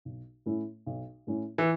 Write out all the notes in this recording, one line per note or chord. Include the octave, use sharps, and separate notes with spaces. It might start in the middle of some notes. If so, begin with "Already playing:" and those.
B1
A2 A3 C#4 E4
B1
A2 A3 C#4 E4
E3